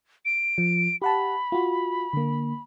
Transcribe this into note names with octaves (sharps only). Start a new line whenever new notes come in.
D7
F3
G4 F#5 A5 B5
F4 F#4
D3 A#3